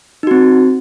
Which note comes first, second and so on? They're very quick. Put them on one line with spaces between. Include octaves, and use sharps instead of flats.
D#4 F#4 C4